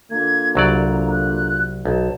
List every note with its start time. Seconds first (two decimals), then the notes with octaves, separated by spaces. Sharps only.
0.12 D3 A#3 F4 G#6
0.55 C2 F#3 D5 A#5
1.11 F#6
1.85 B1 A5